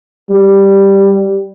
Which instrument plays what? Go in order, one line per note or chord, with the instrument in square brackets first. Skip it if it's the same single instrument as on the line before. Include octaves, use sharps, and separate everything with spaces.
[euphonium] G3